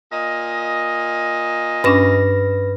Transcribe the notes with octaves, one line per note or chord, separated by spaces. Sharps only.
A#2 D#5
G2 C#4 D4 B4 A#6